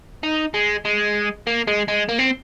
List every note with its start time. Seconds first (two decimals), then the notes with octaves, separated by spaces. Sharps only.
0.23 D#4
0.54 G#3
0.85 G#3
1.47 A#3
1.67 G#3
1.88 G#3
2.09 A#3
2.19 C4